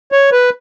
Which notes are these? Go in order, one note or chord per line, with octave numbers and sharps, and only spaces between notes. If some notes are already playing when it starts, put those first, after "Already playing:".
C#5
B4